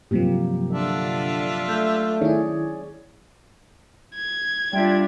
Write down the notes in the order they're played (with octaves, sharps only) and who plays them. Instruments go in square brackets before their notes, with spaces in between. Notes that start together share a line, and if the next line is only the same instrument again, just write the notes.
[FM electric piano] G2 C3 F3 [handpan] F#3 A#3 G4
[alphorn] D3 [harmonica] D4 F4 E5
[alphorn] A3 [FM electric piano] G6
[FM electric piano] D#3 E4 [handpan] G#4 C#5 D5
[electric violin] G#6
[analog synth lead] G3 [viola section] D4 F4 [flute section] D5 E5 G5